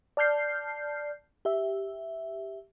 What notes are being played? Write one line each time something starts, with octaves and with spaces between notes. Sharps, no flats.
D5 A5 F6 G6 C7
G4 E5